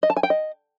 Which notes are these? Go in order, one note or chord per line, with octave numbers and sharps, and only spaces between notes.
D#5
A5
G#5
G5
D#5